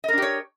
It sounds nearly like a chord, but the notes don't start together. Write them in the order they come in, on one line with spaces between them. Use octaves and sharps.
D#5 A#4 D4 G4 C#5